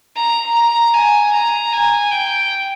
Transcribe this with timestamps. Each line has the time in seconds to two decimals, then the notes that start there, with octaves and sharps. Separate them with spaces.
0.16 A#5
0.54 A#5
0.93 G#5
1.33 A#5
1.73 G#5
2.11 G5